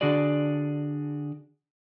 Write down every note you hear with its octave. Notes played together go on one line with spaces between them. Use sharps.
D3 D4 F#4 G#4 D5